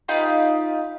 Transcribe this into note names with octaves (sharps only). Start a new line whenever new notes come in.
D#4 F4 G4 B4